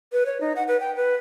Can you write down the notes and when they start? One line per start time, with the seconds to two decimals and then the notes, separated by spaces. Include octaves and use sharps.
0.13 B4
0.26 C#5
0.41 D#4
0.56 F#5
0.68 B4
0.80 G5
0.96 B4